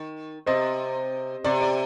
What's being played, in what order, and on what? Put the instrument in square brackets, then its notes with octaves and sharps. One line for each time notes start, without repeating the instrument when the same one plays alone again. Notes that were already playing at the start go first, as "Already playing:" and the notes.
Already playing: [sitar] D#3
[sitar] C3 [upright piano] C5 D#5
[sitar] C3 [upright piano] D5
[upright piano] D5